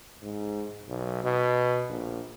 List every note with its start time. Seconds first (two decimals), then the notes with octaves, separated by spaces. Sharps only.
0.22 G#2
0.88 B1
1.24 B2
1.89 A#1